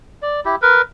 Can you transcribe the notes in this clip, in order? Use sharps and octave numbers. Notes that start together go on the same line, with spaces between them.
D5
E4 G4
A#4 B4